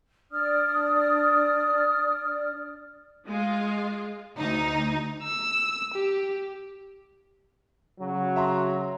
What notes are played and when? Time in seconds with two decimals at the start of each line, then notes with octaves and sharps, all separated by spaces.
0.31 D4 D5 D#6 F6
3.27 G#3 F4
4.38 D2 D#4
5.24 E6
5.94 G4
7.99 C#3 F#3
8.36 E5 A#5 C6